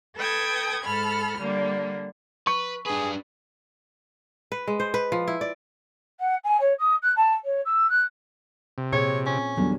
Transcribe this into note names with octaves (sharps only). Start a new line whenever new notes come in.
A4 B4 G5 D#6 G#6
G#2 A4 B5 F6
D3 G3 A#3
B4 C#6
D4 G#4 B4
B4
G#3
C5
B4
F3
E4
D5
F#5
G#5
C#5
D#6
F#6
A5
C#5
E6
F#6
C3
A#2 C4 G#4 C#5 G#6
C#4
E2 D3 F#3 G3